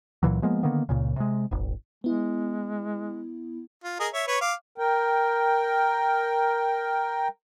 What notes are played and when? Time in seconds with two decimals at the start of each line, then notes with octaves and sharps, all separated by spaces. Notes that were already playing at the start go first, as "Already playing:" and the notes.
0.23 C#2 A#2 E3 F#3
0.42 F3 G#3 A#3 B3
0.63 D3 D#3 A#3 B3
0.89 C#2 A#2 C#3
1.16 C3 G#3
1.51 D#1 G#1
2.04 G#3 B3 E4
3.84 F4
4.00 G#4 A#4 D#5
4.14 C#5 E5
4.28 B4 C#5 C#6
4.41 F5 D6
4.78 A#4 G5